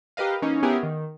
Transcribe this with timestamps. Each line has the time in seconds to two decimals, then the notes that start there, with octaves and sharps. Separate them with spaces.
0.17 G4 A#4 B4 D#5 F5
0.42 E3 A#3 C#4 D#4
0.63 B3 C#4 E4 G4 G#4 A#4
0.83 D#3